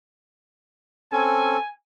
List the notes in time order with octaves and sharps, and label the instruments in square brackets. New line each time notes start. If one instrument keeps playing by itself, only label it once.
[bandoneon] C4 C#4 A4 [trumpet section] G#5